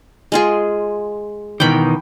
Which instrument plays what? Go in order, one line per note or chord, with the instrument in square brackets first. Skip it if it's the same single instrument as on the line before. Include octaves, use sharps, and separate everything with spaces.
[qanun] G#3 F4 G#4
[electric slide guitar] B2 D#3 E3 [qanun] G5 B5